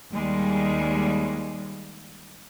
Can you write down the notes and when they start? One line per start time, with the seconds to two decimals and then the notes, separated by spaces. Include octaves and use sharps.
0.12 D#2 G3 G#3